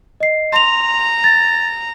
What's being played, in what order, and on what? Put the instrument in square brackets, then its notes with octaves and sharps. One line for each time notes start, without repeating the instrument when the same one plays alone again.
[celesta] D#5 C7
[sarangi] A#5 [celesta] C6 F7
[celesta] A6